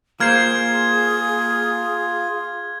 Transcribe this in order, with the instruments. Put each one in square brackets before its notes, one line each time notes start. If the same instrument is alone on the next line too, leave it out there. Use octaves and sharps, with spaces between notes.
[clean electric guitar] A#3 C5 [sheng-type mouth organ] F4 [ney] G#4 [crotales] F6 G#6